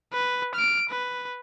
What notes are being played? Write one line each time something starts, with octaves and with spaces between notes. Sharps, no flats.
B4
F6 D7
B4